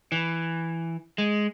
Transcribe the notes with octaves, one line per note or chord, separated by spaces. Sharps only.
E3
G#3